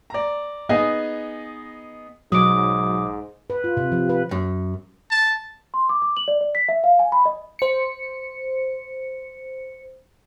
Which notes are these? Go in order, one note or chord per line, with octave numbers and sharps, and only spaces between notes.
D5 A#5
B3 D#4 G#4 D#5 G#5
B1 G#2 F#3 D6 D#6
B4
F4
C3
F3
B4
F#2
A5
C6
D6
D6
F#7
D5
D5
B6
E5
F5
G#5
B5
D#5
C5 C#7